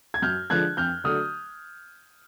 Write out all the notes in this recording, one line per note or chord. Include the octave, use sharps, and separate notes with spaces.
G#6
F#2 F6 G6
D3 F3 G#3 F#6 G#6
F2 F6 G6
D3 F#3 A3 D#6 F6